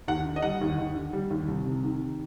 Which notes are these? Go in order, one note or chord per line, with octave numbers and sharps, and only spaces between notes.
D#2 F#5
D3
D#5
G3 F#5
D#2
D#2
D3
G3
D#2
C2
C3
D#3